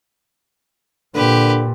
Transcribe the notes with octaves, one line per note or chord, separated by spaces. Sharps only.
A#2 D3 G4 B4